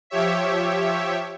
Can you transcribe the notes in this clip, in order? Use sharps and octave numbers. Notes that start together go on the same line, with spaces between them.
F3 G4 C#5 E5